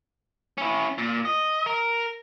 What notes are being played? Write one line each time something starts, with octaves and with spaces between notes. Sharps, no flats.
C#4 E4
A#2
D#5
A#4